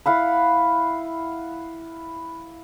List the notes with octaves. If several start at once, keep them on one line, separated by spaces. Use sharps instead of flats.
E4 F5 F#5 B5